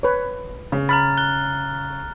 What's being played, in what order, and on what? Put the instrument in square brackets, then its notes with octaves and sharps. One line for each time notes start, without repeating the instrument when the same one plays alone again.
[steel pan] B4 C#5
[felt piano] C#3
[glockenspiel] A#5 F6 A6 [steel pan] B5
[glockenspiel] F#6 G7